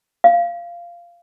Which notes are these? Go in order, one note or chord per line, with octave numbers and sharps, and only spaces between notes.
F5